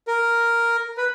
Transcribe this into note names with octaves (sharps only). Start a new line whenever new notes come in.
A#4
B4